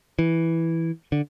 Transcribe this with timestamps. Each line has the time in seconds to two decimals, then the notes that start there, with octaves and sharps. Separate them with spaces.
0.19 E3
1.12 D3